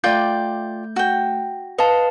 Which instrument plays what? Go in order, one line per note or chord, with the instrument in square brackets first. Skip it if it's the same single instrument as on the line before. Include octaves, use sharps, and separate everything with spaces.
[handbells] A3 G6 [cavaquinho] F4 D5 G5
[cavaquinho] F#4 G5
[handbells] B4 F5 A5 [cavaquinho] D#5